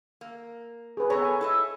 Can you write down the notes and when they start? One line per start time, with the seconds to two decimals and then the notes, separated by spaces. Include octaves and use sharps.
0.21 A#3
0.97 G#4 B4
1.10 B3 A4 C#5 A#5
1.22 G#5
1.41 E4 A4 D#5